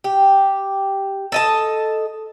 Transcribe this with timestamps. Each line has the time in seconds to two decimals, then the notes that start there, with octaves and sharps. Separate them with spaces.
0.04 G4
1.32 A4 D#5 A5